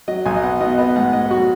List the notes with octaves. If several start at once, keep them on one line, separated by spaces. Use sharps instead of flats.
F#3 D#5
B1 G#5
D#5
B3 F#5
B2 D#5
B3 D#5
G#2 F#5
G#2 D#5
F#3 F#4